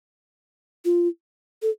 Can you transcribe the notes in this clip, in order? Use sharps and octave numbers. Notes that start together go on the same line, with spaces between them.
F4
A4